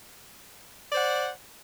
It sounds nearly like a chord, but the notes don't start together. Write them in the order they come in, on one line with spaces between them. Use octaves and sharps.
D5 C5 F#5